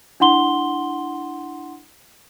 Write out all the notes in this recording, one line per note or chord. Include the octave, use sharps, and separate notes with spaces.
D4 E4 F#5 C6 G7